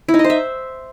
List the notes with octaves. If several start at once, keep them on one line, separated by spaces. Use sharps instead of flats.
E4
D#4
D#5
C5
E5